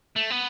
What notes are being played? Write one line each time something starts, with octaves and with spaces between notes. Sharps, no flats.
A3
B3